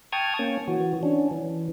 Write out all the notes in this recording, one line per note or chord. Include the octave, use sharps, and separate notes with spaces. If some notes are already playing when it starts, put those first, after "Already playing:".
G5 A5 C#6 D#6 F6 G#6
A#3 C#4
E3 F#4
C#4 D4
E3